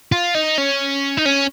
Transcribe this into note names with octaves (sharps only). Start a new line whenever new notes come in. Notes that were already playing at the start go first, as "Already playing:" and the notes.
F4
D#4
C#4
D#4
C#4